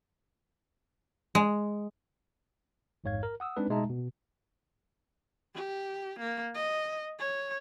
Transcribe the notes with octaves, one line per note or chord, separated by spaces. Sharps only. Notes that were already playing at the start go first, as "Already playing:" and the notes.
G#3
A1 F2 G#2 C#5 F5 G#6
A#4
F#5 D#6 E6
G#3 C4 D4 D#4 B4
B2 G#3 D#4 E5 A5 A#5
B2
G4
A#3
D#5
C#5